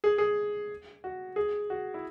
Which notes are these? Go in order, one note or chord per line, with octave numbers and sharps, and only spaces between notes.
G#4
G#4
F#4
G#4
F#4
E4